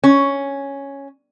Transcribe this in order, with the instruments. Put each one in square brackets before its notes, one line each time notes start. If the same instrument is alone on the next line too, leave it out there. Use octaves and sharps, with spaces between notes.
[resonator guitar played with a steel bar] C#4